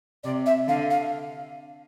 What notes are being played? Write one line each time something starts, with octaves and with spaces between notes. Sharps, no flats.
C3 D5
E5
D3 F5
F5